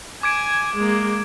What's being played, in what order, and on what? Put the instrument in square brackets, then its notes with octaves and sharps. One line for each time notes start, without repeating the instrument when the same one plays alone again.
[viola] G#5 [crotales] D6 G#6 D7
[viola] G#3 A#3